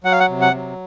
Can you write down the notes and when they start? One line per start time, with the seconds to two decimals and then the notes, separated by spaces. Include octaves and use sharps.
0.04 F#3 F#5
0.12 F5
0.20 F#5
0.30 C3
0.41 F#5
0.54 F#3